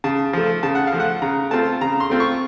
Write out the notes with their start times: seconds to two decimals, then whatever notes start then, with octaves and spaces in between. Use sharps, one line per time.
0.04 C#3 A5
0.33 F3 A3
0.63 C#3 A5
0.75 F#5
0.87 F5
0.93 F3 A3
1.00 F#5
1.22 C#3 A#5
1.51 A3 C4 F4 A5
1.81 C#3 A#5
2.00 C6
2.10 A3 C4 F4
2.20 C#6